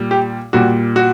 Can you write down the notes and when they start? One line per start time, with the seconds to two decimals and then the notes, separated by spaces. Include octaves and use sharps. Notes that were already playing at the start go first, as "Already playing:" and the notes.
Already playing: A#2 G3
0.11 G4
0.53 A#2 G3 F#4
0.96 F#4